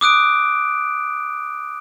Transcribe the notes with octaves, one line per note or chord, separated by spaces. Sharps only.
D6 D#6 F#6 D7